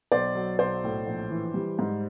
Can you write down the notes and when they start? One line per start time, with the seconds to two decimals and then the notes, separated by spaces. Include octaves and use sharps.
0.12 B1 C5 D5
0.35 F#3
0.59 B1 C5 D5
0.84 A2
1.07 A#1
1.30 E3
1.54 G3
1.79 G#2